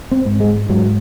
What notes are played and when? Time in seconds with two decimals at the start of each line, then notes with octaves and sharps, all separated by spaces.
0.11 C4
0.25 G#2
0.40 G#3
0.69 G#2 F#3